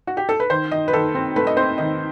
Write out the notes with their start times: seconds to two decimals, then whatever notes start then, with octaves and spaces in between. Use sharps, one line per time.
0.07 F#4
0.17 G4
0.29 A4
0.40 B4
0.50 D#3 C5
0.71 D#3 D#5
0.88 B4
0.93 D#3 A4
1.15 C4
1.36 A3 B4
1.47 D#5
1.57 C4 C5
1.78 D#3 D#5